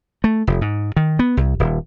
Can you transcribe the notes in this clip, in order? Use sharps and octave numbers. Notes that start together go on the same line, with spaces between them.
A3
F1
G#2
D#3
B3
C2
D#1